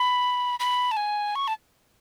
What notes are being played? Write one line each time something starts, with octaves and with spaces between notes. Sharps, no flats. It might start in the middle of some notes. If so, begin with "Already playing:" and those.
Already playing: B5
B5
A5
G#5
C#6
A5